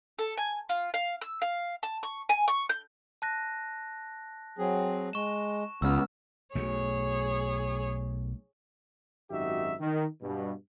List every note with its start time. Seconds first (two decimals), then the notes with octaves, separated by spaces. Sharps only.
0.19 A4
0.37 G#5
0.69 F4
0.94 F5
1.21 E6
1.42 F5
1.83 A5
2.03 C#6
2.29 G#5
2.48 C#6
2.69 G6
3.22 A5 F#6 A#6
4.58 F#3 C4 G#4
5.13 G#3 C#6 E7
5.82 C#2 B3 E6 F6
6.55 B1 F#3 A3 G#4 C#5
9.30 G#1 F#2 D#4 F#4 G4 E5
9.79 D#3
10.21 G2 B2